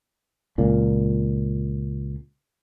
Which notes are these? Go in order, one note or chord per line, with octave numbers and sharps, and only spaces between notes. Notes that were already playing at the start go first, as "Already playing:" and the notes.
C#2 A#2